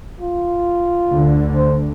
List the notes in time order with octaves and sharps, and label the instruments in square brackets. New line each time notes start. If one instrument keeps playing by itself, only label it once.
[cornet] F4
[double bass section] D2 D3
[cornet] C5